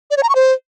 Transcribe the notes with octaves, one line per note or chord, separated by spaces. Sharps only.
D5
C#5
A#5
C#6
C5